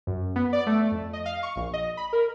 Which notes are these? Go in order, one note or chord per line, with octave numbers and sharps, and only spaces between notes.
F#2
B3
D5
A3
F2
D#5
F5
C#6
A#1
D#5
B5
A#4